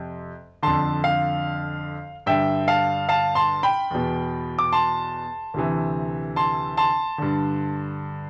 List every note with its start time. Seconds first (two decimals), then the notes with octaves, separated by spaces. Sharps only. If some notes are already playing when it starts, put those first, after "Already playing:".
Already playing: F2 C3
0.63 F2 D3 A5 C6
1.04 F5
2.26 G2 D3 E5 G5
2.68 F5 A5
3.09 F5 A5
3.35 A5 C6
3.63 G5 B5
3.91 E2 B2
4.59 D6
4.72 A5 C6
5.54 D2 C3 E3
6.36 A5 C6
6.77 A5 C6
7.18 G2 D3